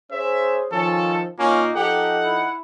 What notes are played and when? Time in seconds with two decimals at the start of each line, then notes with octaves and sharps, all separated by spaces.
0.11 C#4 G#4 C5 E5
0.72 D#3 F3 C#4 A4
1.39 A#2 A#3 C#4 D#4 F4
1.76 F3 D#4 G4 A4 F#5
2.24 E4